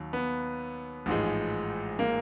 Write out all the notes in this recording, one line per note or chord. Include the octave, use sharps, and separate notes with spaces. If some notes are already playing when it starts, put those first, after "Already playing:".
Already playing: D#2 D#3 F#3
B3
A1 G#2 F3 G#3
A#3